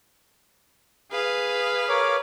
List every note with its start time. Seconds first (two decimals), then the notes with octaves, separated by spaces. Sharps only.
1.12 G#4 B4 F5
1.89 A#4 C#5 D6